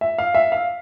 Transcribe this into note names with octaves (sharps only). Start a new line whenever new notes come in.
E5
F5
E5
F5